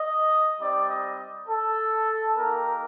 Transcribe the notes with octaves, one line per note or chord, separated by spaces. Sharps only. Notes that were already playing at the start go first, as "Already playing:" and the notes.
Already playing: D#5
G3 C4 D#4 G4 D5
D#5
A4
A#3 D#4 G4 A#4